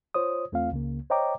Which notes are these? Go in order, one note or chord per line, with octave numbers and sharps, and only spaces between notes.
F4 C5 C#5 D#6
E2 A3 C4 F4 F5
C#2 C#3 A#3
C5 C#5 D#5 G5 A#5 D6